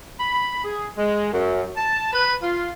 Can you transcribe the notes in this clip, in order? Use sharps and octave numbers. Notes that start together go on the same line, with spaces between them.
B5
G#4
G#3
F#2
A5
B4
F4